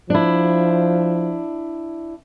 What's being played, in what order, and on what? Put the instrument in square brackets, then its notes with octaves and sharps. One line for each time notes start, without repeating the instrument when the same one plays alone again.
[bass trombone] F3 [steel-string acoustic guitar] D4 E4